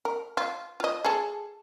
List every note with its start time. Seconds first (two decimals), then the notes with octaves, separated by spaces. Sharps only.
0.05 A#4
0.37 F4
0.80 F4 D#5
1.04 G#4 A4